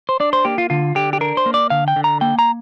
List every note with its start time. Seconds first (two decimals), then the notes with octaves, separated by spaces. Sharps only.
0.09 C5
0.20 D4 D5
0.33 C5
0.45 A#3 G4
0.58 F4
0.70 D3 F4
0.95 D3 G4
1.13 G4
1.21 D4 A#4
1.37 C5
1.46 A#3
1.54 D5
1.70 D3 F5
1.88 G5
1.96 D3
2.04 A#5
2.21 A#3 G5
2.39 A#5